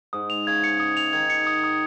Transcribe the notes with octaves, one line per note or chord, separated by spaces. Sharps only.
G#2 D#6
F7
C#3 G#6
C#7
D#6
F7
D#3 G#6
C#7
D#6
D#6